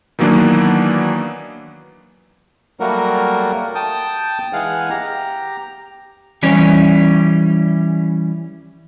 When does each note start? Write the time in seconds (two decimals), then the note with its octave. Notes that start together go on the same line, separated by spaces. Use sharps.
0.19 D#3 E3 F#3 A#3 B3 D4
2.80 F#3 G3 A3 A#3 F#4 A#4
3.75 G5 A5 D#6 G6
4.53 E3 G#3 G#4 F5 F#5
4.90 G4 A#5
6.43 E3 G3 C#4